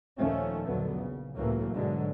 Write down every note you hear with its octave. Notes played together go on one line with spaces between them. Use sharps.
D#2 A#2 D#3 F3 A3 C#4
A#1 D#2 D3 F#3 B3
C#3
C#2 A2 E3 F#3 A3 A#3
G#2 B2 D3 F#3 G#3